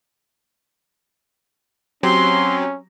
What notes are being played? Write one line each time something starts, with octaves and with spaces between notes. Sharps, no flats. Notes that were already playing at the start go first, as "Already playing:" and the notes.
F#3 C4 C#4 G4 C6